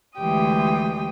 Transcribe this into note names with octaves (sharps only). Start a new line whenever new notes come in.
D2 E3 G#3 G4 G5 D#6